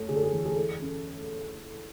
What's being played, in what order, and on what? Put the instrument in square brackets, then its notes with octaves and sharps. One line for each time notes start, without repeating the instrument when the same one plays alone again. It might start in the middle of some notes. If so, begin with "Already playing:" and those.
Already playing: [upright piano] F#2 A3 E4 A4 C#5
D3 G#4
A4
G#4
E2
G#4
E4 A4
C#4